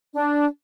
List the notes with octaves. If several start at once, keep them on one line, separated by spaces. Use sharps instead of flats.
D4